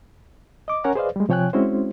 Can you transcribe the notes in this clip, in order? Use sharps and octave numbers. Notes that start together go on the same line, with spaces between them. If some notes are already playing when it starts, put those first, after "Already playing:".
D#5 D6
C#4 A#4 C#5 F#5 G#5 A#5
G#4 B4 C5 D5 D#5 F5
G3 G#3
C3 F3 C#5 G5 G#5 F#6
G#3 C4 C#4 E4 F#4 C5